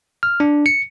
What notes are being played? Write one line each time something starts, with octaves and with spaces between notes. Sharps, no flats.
F6
D4
C#7